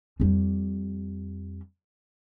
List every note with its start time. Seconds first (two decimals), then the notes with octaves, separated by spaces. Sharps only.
0.20 F2 G3